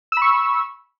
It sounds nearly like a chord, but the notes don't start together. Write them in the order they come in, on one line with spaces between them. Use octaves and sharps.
E6 B5 C#6